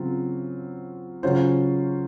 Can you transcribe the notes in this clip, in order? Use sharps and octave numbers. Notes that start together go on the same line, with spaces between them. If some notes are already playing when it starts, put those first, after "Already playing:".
Already playing: C#3 F#3 C4 F4
C#3 F#3 C#4 F4 C5